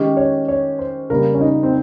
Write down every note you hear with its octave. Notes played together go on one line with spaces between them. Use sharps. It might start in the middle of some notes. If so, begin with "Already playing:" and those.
Already playing: D#3 G#3 C#4 G4
C#5
C#5
C5
C#3 G3 A#3 A#4
C#4
D#4
C4